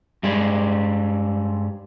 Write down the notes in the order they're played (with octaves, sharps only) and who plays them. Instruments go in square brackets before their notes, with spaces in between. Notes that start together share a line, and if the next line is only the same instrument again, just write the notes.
[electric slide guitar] G2 G3 G#3